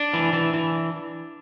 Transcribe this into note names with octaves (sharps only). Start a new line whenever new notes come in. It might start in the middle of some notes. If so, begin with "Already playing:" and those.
Already playing: D4
E3
E3
E3